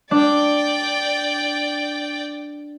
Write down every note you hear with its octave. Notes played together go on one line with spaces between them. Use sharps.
D4 D5 G5